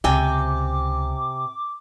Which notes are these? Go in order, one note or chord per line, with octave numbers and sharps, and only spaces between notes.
C#2 C3 G5 G#5 D6